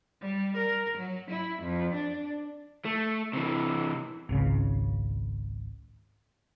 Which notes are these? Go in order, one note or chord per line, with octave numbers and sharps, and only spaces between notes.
G3
A#4
F#3
E4
F2
D4
A3
C3 E3
G#1 C#2 C#3